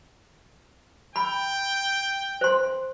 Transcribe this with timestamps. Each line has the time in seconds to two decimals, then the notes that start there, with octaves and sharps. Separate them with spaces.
1.16 G5 B5
2.41 C5 C6